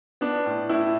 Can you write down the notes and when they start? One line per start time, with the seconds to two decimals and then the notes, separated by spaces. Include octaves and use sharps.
0.21 B3 D4
0.46 A2
0.70 A2 E4